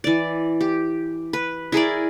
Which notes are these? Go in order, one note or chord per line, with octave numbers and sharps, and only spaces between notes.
E3 D5
G4
B4
E4 G#4 A#4 D5